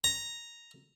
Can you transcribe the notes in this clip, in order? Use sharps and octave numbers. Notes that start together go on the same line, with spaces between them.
A#5